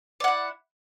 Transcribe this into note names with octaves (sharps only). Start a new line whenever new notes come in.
E4 D5 F#5